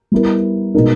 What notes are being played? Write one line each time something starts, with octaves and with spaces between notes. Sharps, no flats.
G3 B3 E4 A#4
B2 G#3 D#4 A#4